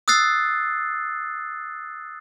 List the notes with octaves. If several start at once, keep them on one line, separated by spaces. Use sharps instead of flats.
D#6 E6 F#6 A6 C7